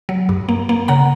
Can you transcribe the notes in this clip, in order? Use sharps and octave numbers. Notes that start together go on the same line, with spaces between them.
F#3
G2
A#3
A#3
C#3 F#5 A#5